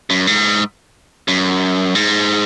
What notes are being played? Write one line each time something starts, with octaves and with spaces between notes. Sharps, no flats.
F#2
G#2
F#2
G#2